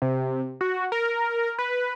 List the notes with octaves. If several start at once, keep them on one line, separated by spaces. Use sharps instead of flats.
C3
F#4
A#4
B4